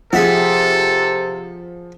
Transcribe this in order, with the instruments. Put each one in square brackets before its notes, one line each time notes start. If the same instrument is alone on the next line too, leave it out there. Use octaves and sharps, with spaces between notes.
[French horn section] C3 [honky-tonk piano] F3 [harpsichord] G#4 E5 F#5 [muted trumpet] A4